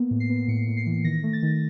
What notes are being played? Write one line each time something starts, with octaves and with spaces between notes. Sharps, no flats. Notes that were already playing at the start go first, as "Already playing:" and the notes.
Already playing: A#3 B3
A2
C7
B3
C7
A2 C#7
A2
C7
E3
D#3 A#6
A3
A6
D#3